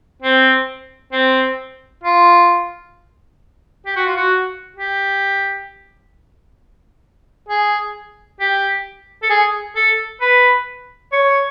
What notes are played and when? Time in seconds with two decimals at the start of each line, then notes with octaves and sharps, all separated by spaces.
0.22 C4
1.13 C4
2.04 F4
3.86 G4
3.96 F#4
4.06 F4
4.16 F#4
4.77 G4
7.49 G#4
8.40 G4
9.23 A4
9.30 G#4
9.76 A4
10.21 B4
11.12 C#5